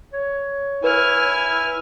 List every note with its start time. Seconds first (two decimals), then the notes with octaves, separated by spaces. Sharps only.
0.13 C#5
0.84 E4 B4 G#5 F6